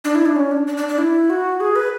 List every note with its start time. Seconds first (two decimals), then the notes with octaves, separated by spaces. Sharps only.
0.04 D4
0.15 E4
0.26 D4
0.36 C#4
0.51 D4
0.67 D4
0.77 D4
0.89 D4
0.98 E4
1.30 F#4
1.60 G#4
1.76 B4